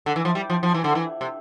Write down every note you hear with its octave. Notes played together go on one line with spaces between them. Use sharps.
D3
E3
F3
G3
F3
F3
E3
D3
E3
C3